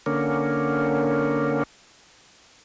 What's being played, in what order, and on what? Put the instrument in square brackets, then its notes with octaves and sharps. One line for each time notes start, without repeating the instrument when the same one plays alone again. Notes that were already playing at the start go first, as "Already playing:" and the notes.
[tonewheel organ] D3 A#3 C#4